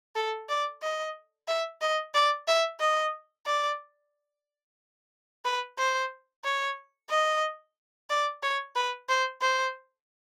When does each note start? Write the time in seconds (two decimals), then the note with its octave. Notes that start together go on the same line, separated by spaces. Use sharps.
0.16 A4
0.49 D5
0.82 D#5
1.48 E5
1.82 D#5
2.14 D5
2.48 E5
2.80 D#5
3.46 D5
5.45 B4
5.78 C5
6.44 C#5
7.10 D#5
8.10 D5
8.43 C#5
8.76 B4
9.09 C5
9.42 C5